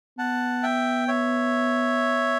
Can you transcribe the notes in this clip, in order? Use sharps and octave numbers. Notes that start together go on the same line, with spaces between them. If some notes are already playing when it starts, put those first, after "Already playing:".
B3 F#5 A5
E5 G5
C#5 E5